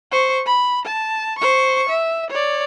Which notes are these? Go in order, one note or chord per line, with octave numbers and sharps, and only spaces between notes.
C5 C#6
B5
A5
C5 C#6
E5
C#5 D5